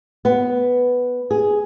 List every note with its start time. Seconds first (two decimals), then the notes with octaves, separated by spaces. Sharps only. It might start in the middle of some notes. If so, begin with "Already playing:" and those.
0.25 B3
1.31 G#4